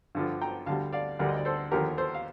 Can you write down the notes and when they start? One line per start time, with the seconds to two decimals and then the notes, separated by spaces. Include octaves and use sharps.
0.15 G2 D3 F3
0.41 G5 A#5
0.66 D2 D3 G3 F5 A5
0.92 D5 F5
1.19 D2 D3 G3 A#4 D5
1.29 D#5
1.36 D5
1.45 A4 C5
1.71 D#2 D3 F3 G4 A#4
1.97 A4 C5
2.15 F5